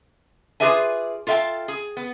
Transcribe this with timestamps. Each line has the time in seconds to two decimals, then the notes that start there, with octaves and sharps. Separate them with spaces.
0.60 F4 G#4 B4 D5 E5 G#5
1.27 F4 A4 E5 F5 G5
1.68 G#4
1.97 B3